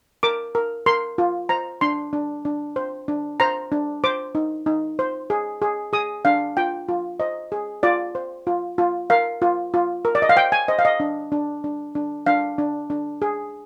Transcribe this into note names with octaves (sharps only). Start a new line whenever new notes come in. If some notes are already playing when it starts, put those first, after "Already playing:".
A#4 D6
A#4
A#4 C6
F4
C5 A#5
D4 C6
D4
D4
C5
D4
C5 A#5
D4
C5 D6
D#4
D#4
C5
G#4
G#4
G#4 D#6
D4 F5
F4 G5
F4
C5 D#5
G#4
F4 D5
C5
F4
F4
A#4 F5
F4
F4
A#4
D5
D#5
F5
C5 G5
G#5
C5 D#5
F5
D#5
D4
D4
D4
D4
D4 F5
D4
D4
G#4